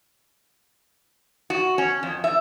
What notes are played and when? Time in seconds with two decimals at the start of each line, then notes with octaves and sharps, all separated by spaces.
1.50 F#4
1.78 C#4
2.03 F2
2.24 E5